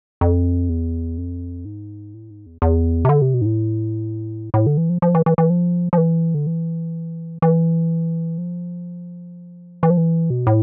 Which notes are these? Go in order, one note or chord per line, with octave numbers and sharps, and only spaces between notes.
F2
E2
F2
G#2
A2
G#2
E2
E2
C3
D3
C3
B2
G#2
A2
A2
D3
E3
F3
F3
E3
E3
E3
F3
F3
E3
D3
E3
E3
F3
E3
F3
E3
B2
A2